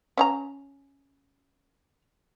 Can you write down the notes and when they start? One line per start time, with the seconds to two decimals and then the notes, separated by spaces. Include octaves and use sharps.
0.17 C#4 F#5 A#5